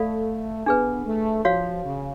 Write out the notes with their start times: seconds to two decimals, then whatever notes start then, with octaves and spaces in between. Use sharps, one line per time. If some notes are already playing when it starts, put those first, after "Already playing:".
Already playing: A3 A4 D5 F5 B5
0.66 B3 D4 G#4 B4
1.05 A3
1.45 F3 F#4 C#5 F5
1.84 C#3